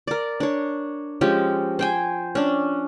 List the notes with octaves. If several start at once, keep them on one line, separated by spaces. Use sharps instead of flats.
A#4 D5
D4 C#5
F3 G#3 C#4 G4
C5 G5 G#5
C#4 D4